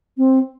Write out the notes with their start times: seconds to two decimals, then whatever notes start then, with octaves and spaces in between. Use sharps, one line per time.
0.17 C4